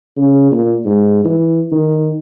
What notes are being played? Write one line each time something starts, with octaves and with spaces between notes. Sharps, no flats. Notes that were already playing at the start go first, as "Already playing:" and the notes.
C#3
A#2
G#2
E3
D#3